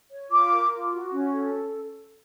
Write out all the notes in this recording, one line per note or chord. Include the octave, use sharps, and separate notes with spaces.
C#5
F4 D6
A#4
F4
F#4
C#4
A4